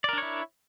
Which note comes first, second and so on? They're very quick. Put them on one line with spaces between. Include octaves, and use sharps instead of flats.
D5 A#4 D4 C#5 E4